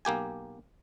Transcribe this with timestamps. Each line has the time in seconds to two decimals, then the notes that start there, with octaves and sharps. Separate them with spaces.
0.05 B1 A#3 G4 G#5